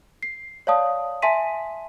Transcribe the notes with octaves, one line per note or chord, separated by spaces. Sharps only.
C7
C#5 D5 F5 A5 D#6
E5 G#5 A5 C6 B6 D#7